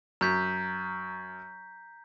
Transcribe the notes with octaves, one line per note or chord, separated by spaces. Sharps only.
F#2 A#5 G6 B6